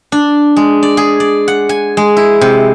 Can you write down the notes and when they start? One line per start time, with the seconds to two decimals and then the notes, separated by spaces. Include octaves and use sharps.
0.12 D4
0.56 G#3
0.83 D5
0.97 G#4
1.20 D5
1.48 F#5
1.69 G#5
1.97 G#3
2.17 E4
2.41 C3